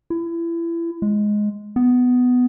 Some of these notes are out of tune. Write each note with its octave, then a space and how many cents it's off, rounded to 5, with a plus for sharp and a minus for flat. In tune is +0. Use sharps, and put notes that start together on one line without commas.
E4 +30
G#3 +5
B3 +10